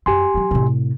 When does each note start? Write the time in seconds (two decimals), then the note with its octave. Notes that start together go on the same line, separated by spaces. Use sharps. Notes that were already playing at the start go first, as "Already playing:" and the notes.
0.06 F#2 G4 G#5 C6
0.34 D#3 F#3
0.51 A2 C3